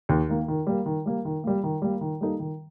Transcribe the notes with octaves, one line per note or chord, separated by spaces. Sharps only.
D#2
D#3 A#3
D#3
G3 A#3
D#3
G3 A#3
D#3
G3 A#3
D#3
G3 A#3
D#3
G3 A#3 D#4 A4
D#3